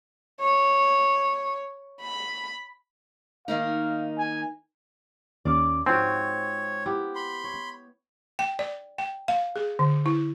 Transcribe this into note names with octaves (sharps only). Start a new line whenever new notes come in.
C#5
B5
D#3 A#3 D#4 F5
G#5
D#2 C#4 D5 F5 D6
G#2 F3 C4 F#4 C#5 G#5
B3 E4 G4
B5 C6
C#5
G5
D5
G5
F5
G#4
D3
E4